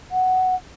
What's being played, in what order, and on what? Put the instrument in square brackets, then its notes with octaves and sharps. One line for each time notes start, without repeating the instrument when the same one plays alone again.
[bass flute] F#5